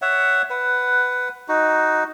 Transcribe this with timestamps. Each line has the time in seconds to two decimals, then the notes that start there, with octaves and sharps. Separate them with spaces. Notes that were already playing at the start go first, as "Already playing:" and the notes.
0.02 C#5 E5 F#5
0.50 B4 F#5
1.48 D#4 F#4